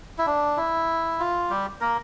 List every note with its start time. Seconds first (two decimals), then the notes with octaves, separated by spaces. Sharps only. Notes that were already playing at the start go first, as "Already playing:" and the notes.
0.18 E4
0.26 D4
0.57 E4
1.20 F4
1.50 G3 G4
1.81 A#3 A#4